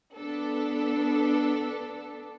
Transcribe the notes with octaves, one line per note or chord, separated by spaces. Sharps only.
B3 D4 A4